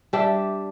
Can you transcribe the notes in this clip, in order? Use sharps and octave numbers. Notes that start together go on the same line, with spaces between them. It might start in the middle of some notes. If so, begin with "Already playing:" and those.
G3 D4 G4 E5